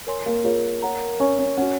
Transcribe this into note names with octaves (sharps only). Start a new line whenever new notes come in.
A#4 C#5 G#5 C6
A#3
A#3 F4 G#4 C#5
A#4 C#5 F#5 A#5
C#4 C#5 G#5 C#6
C#4
C#4 F#4 C#5 F#5